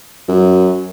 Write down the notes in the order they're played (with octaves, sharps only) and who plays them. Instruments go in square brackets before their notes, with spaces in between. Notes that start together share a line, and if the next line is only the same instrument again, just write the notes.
[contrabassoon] F#2